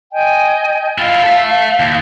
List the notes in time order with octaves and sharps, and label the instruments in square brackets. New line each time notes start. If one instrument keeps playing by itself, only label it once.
[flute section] D#5 G5 G#5
[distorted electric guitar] E4 F4 [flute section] F5
[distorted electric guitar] A4 E5
D#2